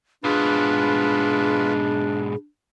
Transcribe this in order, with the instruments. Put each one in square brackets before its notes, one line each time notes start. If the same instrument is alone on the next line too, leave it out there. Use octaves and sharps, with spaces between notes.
[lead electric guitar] G#2 B2 [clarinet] D4 [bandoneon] F4 B4 [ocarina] G#4